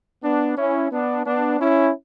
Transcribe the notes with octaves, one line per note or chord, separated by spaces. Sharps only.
B3 D4
C#4 E4
B3 D4
B3 D4
C#4 E4